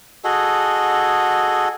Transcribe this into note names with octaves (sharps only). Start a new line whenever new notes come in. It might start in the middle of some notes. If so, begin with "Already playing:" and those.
F#4 G#4 A4 D#5